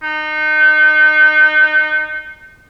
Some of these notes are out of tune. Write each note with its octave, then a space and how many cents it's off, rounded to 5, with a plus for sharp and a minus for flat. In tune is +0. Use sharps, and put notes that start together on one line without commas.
D#4 -25